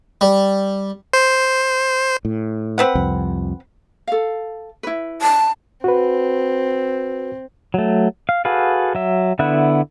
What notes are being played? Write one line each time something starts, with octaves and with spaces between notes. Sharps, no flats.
G3
C5
A2
C4 B4 F#5
C2 F2
A4 F5
E4 B4
A5
C4 F#4 B4
F#3 A3
F5
F#4 G#4 A4 B4 F5
F#3 E5
D3 B3 E4 E5 F#6